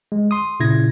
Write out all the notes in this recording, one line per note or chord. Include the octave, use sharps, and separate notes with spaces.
G#3
C6 D#6
A#2 C#3 E4 G#6 A#6